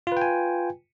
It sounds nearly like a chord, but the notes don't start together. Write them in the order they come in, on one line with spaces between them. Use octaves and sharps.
F4 B4 G5 G#5